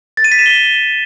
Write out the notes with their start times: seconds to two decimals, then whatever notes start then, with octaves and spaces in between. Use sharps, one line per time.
0.17 A6
0.24 D#7
0.32 B6
0.39 E7
0.46 G7